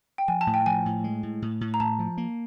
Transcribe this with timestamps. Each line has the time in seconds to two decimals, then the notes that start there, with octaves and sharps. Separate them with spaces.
0.18 G5
0.28 F3 G#5
0.41 A5
0.47 A2
0.54 G5
0.66 F3 G#5
0.86 A2
1.04 G#3
1.23 A2
1.42 A2
1.61 A2
1.74 A#5
1.80 A2 A5
1.99 F3
2.18 A#3